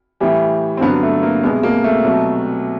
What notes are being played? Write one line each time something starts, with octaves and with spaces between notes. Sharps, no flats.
A2 E3 G3
C4
G2 D3 F#3 B3
A3
A#3
C2 B2 G#3 B3
A#3
A3
C2 B2 F#3